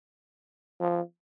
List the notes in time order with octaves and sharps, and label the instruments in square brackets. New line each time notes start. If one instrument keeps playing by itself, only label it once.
[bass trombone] F3